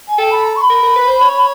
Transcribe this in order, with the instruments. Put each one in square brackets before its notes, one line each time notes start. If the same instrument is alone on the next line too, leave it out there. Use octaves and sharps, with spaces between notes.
[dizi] G#5
[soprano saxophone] A4 [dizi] G5
[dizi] B5
A#5
C#6
B5
[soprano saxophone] A#4
A#4
B4
C5
C#5